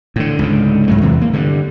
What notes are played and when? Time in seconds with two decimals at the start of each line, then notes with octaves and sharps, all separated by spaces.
0.16 A2 D3
0.39 C#2 G#2 D3
0.88 G#2 F#3 A3
1.01 E2 C3 E3
1.22 A#3
1.33 G2 D3